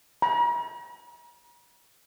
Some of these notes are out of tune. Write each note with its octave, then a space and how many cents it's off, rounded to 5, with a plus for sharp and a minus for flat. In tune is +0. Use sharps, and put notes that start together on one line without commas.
A#5 +45